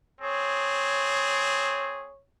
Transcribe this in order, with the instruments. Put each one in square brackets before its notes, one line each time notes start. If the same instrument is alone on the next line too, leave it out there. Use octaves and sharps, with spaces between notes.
[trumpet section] C4 G#4 [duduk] C#5